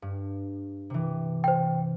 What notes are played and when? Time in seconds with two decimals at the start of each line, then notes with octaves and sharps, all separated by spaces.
0.02 G2
0.90 C3 E3
1.44 C5 G5